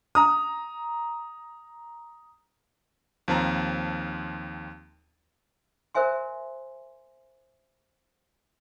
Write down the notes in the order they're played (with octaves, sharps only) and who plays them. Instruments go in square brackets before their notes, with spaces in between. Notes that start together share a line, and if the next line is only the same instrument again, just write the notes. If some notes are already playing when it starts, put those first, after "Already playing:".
[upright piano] A#5 D#6
[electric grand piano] D#2 F3 C4 A5 A#5
[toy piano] A#4 C5 E5 G#5 C6